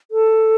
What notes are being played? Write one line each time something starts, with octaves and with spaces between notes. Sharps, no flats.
A4